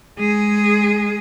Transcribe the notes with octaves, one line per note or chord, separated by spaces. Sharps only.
G#3 G#4